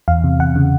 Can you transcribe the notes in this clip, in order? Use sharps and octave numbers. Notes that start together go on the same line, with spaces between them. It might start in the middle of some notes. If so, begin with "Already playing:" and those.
E2 F5
C3
E2 F#5
C#3